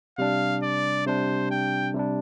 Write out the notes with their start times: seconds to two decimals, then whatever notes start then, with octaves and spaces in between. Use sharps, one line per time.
0.18 C3 G3 D4 F5
0.63 D5
1.07 C3 G3 D4 C5
1.51 G5
1.95 C3 G3 D4